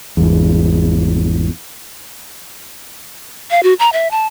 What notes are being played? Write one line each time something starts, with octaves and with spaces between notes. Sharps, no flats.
G#1 E2
F5
F#4
A#5
E5
A5